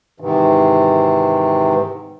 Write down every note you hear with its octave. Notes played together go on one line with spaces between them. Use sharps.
G#2 C3 D#3 E3